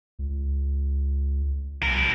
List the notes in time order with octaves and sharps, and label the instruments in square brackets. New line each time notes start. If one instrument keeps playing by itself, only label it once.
[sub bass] C#2
[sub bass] C2 [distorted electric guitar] B2 A#4